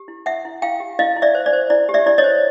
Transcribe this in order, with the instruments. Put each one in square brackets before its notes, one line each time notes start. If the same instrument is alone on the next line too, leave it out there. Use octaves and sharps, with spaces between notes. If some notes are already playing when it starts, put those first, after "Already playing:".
Already playing: [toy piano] G4
E4
E4 E5 F#5
E4
E4 F5 G5
G4
E4 D#5 F5
E4
D5 E5
C5
D5
C5
E4 D5
G4
D5 E5
E4 D5
C#5 D#5
C5